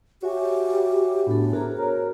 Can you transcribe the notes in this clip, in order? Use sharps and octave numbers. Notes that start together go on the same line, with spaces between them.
F#4 G4 C#5 E5 G#5
A2 B3 D4 A4
F#4 G#4 A#4 C5
A#4 C#5